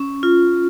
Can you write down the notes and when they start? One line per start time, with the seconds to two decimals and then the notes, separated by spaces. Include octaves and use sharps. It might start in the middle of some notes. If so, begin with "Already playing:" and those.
Already playing: C#4
0.23 F4